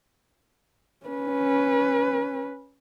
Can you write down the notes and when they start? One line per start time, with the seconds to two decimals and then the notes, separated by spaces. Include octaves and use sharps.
1.07 C#4 B4